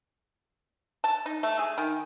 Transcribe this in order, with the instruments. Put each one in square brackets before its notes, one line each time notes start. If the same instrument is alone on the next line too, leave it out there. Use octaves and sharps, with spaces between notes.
[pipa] A5
D#4
A3
G#4
D#3